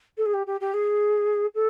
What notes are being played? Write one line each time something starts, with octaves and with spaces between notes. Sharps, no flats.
A4
G#4
G4
G4
G4
G#4
A4